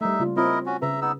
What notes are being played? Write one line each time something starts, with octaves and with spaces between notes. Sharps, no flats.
G3 A3 D#4 E5
C#3 A#3 F4
C4 E4 F4 A#4 C#5 D#5
C#4 F#4
C#3 B4 E5 A#5
B3 D#4 E6